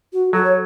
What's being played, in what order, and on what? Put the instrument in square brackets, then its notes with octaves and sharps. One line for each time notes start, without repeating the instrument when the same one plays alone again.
[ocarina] F#4
[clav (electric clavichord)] F#3 [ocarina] A4
[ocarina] C#5